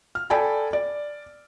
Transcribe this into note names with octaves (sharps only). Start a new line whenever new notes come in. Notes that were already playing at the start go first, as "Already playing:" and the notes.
F6
A4 D5 G5 G#5 B5
D5